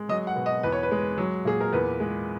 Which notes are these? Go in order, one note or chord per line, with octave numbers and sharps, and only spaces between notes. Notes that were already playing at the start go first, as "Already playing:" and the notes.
Already playing: G#3
F#3 D#5
F#5
B2
D#5
E2 B4
C#5
B4
G#3
F#3
A#2 G#4
A#4
E2 B4
G#3